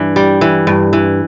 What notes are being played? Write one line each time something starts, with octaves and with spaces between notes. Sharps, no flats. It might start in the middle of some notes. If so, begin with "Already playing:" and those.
Already playing: G2 E3 D4
G3
E3
G2
E3